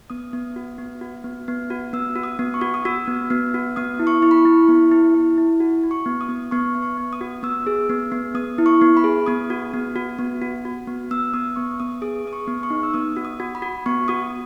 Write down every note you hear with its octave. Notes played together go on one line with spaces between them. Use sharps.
B3 D#6
B3
F#4
B3
F#4
B3
B3
F#4
B3 E6
F#4
D#6
B3
C#6
F#4
D#6
F#4 E6
B3
B3
F#4
B3 D#6
E4
C#6
E4
B5
C#6
E4
B3
E4
E4
E4
F#4
F#4
C#6
B3
D#6
B3
B3 C#6
B3
C#6
B3
D#6
F#4
B3 E6
G#4
B3
B3
B3 D#6
E4
C#6
B3
B5
G#4
B3 D#6
F#4
B3
F#4
B3
F#4
F#4
B3
B3 E6
B3 D#6
B3 C#6
B3 D#6
G#4 D#6
B3 D#6
C#6
B3
C#6
D#4
E6
B3 D#6
F#4
D#6
F#4
B5
F#4
B3 C#6
F#4 D#6